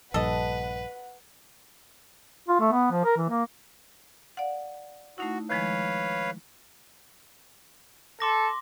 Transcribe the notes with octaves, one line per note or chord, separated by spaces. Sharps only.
A#1 G2 A4 B4 D#5 F#5
F4
A3
B3
F3
A#4
E3
A#3
D5 F5 F#5
A3 D#4 E4 F#4
D#3 F3 G#3 B4 C#5 F5
A4 C6 D6 A#6